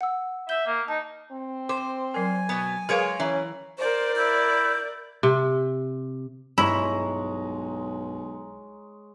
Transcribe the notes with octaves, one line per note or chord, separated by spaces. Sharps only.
F#5 E6
E5 G6 G7
A#3
D#4 A5
C4
C5 D6
F#3 A#4 G#5
B2 B3
G#3 G#4 A#4 B4 C#5 F5
E3 C#4 E5 A#5
A#4 C5 D5
E4 G6
C3
B1 G2 G#3 E4 C#5 A#5